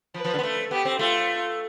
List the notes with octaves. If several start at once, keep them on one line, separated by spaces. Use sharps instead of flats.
F3 B4
F3
D3
B3
A3
B3 G4
C4
A3 F4